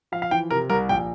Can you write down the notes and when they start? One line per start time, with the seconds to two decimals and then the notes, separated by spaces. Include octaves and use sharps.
0.12 F3 F5
0.22 F5
0.31 E3 G5
0.50 C3 A#4
0.70 C2 A#4
0.89 A#1 G5